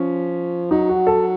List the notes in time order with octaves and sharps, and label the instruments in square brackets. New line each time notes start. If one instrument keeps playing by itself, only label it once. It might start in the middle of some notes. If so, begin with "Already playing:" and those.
Already playing: [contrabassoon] F3 [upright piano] C#4
[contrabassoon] F#3 [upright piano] D#4
[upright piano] F#4
A4